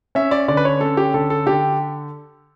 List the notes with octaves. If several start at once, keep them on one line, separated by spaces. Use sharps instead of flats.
C#4 E5
D5
D3 D5
B4
C#5
C#4 A4
G4
D3 A4
A4
D3 G4